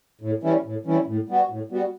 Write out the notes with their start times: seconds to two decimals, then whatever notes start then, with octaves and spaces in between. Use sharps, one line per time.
0.21 A2
0.43 E3 G3 C#4 E4
0.65 A2
0.86 E3 G3 C#4 E4
1.07 A2
1.29 G3 B3 F#4
1.50 A2
1.71 G3 B3 F#4